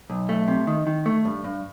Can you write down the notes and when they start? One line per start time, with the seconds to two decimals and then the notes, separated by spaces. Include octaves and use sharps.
0.10 B1
0.29 A3
0.48 C3
0.67 D#3
0.87 D#3
1.06 A3
1.25 G2
1.44 G2